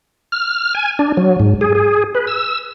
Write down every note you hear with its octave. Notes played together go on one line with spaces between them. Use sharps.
F6
G#5
D4
F#3
G#2
G#4
G#4
B4
E6